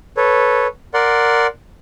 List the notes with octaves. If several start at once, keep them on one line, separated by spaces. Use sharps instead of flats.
A4 B4 C#5
A#4 D5 F#5 C6